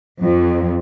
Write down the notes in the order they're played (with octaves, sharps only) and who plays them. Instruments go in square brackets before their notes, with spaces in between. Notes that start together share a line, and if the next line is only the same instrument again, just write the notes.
[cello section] F2